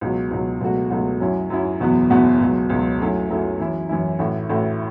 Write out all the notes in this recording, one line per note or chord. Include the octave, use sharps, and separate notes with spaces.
C#2 B2 F#3
C#2 B2 F#3
C#2 B2 F#3 A3 F#4
C#2 B2 F#3 A3 F#4
F#2 F#3 C#4 E4
F#2 F#3 C#4 E4
F#1 E2 B2 F#3 B3
F#1 E2 B2 F#3 B3
C#2 B2 F#3
C#2 B2 F#3
F#2 F#3 A3 C#4 E4
F#2 F#3 A3 C#4 E4
F#2 E3 C#4 E4
F#2 E3 C#4 E4
A1 A2 A3 F#4
A1 A2 A3 F#4